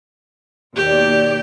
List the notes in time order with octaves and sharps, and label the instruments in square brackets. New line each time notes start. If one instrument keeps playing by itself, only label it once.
[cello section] D#2 B2 D5 [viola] G4